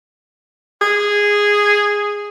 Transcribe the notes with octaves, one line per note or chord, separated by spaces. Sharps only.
G#4